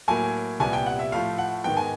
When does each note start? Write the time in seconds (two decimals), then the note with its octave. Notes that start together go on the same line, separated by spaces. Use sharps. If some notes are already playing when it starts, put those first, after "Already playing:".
0.08 A2 F#3 A#3 G#5
0.60 C2 A#2 G3 B3 G#5
0.73 G5
0.86 F#5
0.99 E5
1.12 A2 F3 A3 F5
1.38 F#5
1.64 G#2 D#3 G#3 B3 G5
1.77 G#5